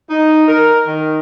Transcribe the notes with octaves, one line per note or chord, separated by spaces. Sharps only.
D#4
A#4
D#3